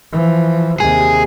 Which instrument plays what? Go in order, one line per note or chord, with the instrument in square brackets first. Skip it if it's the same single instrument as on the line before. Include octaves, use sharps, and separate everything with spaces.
[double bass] E3 F3
[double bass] D#2 C3 [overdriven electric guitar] G#4